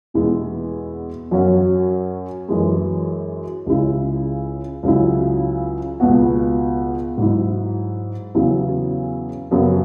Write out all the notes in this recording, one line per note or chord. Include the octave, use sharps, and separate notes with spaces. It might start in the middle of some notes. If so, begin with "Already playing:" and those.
E2 B2 G#3 B3 E4
F#2 F#3 C#4 F#4
F#2 E3 G#3
C#2 C#3 G#3 E4
C#2 C#3 F#3 E4
C#2 B2 B3 F#4
G#2 F#3 E4
E2 C#3 F#3 E4
F#2 C#3 F#3 B3